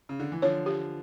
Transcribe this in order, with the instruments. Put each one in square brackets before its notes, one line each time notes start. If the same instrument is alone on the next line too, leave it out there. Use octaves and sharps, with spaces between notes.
[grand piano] C#3
D3
E3
[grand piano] D3 F3 [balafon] C#5
[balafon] G4